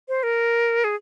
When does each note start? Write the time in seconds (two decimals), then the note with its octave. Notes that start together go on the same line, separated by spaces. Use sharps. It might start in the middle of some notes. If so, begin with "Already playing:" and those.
0.09 C5
0.23 A#4
0.84 G#4